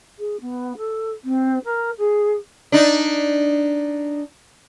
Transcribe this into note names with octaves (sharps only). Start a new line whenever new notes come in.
G#4
B3
A4
C4
A#4
G#4
D4 D#4